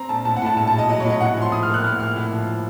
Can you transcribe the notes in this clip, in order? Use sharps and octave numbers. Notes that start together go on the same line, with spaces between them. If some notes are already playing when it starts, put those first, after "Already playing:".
Already playing: C4 A#5
A#1 A5
A2 A5
F#5
A2 A5
A#1 A5
A5
F#3
D#5
F#3 D#5
C#5
A2
D#5
A2 F#5
F3 C6
A2 D#6
F6
A#3
F#6
A2 F6
A#3 F6
A2
F3